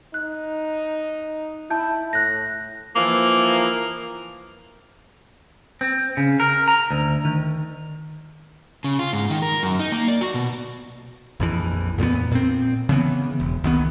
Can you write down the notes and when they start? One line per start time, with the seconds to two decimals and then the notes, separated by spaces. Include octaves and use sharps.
0.14 D#4 F#6
1.70 E4 A5 G6
2.13 A2 F#6 A#6
2.96 E3 F3 A#3
5.81 C4
6.17 C#3
6.40 A#4
6.68 A#5
6.91 D2
7.25 D#3
8.84 C#3
8.99 F4
9.13 G#2
9.30 D#3
9.42 A#4
9.63 F#2
9.79 D#4
9.92 A#3
10.08 D5
10.21 F#4
10.34 B2
11.40 A#1 F2 E3
11.98 F2 A#2 A#3 B3
12.32 A#2 C4
12.89 C#3 E3 B3
13.40 E1
13.64 C2 D#3 B3